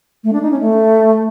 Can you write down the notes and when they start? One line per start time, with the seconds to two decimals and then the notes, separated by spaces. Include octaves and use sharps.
0.24 A3
0.33 D4
0.42 D#4
0.51 C#4
0.60 A3